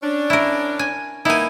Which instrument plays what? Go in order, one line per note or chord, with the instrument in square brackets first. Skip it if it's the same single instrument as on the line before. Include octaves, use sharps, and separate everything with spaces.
[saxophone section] C#4 D4
[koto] E4 A#4
G#5
[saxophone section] A#3 B3 D#4 [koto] E4 G#5